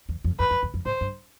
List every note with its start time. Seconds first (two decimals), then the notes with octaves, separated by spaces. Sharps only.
0.09 E2
0.24 F2
0.39 F2 B4
0.51 F2
0.63 E2
0.74 F2
0.86 A2 C5
1.01 G2